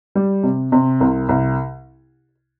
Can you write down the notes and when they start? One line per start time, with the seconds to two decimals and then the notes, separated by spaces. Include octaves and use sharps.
0.15 G3
0.43 C3
0.72 C3
1.01 C2
1.29 C2